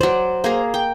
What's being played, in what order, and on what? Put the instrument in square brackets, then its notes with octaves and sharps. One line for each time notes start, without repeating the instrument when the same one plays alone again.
[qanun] F#3 D5 [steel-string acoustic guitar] C5
[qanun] A#3 G#4 A#5
G5